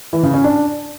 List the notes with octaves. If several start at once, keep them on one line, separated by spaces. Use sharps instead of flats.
E3
C#3
C#4
D4